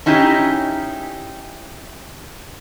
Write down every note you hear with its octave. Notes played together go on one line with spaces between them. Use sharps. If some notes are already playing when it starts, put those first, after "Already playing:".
C#4 D#4 E4 G4 G#4